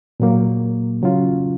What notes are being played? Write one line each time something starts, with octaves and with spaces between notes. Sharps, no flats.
A#2 F#3 A#3
C#3 F#3 C#4 F4